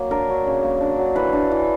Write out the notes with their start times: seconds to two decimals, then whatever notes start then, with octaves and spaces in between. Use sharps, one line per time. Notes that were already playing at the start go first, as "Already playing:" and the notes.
Already playing: F#3 A#3
0.11 D4 A#4
0.30 F#3
0.47 C#3
0.63 A#3
0.81 D4
0.98 F#3
1.15 E3 B4
1.33 D4
1.52 E3